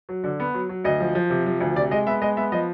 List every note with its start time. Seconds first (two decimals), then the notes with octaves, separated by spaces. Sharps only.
0.09 F#3
0.24 D3
0.40 B3
0.54 F#3
0.69 F#3
0.84 D2 D#5
1.00 F3
1.15 F3
1.30 C3
1.46 F3
1.61 D2
1.76 C3 D5
1.91 G#3 D#5
2.06 B3 E5
2.22 G#3 D#5
2.37 B3 E5
2.52 F3 D#5